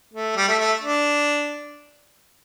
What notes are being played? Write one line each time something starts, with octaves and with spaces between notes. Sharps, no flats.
A3
G3
A3
A3
D4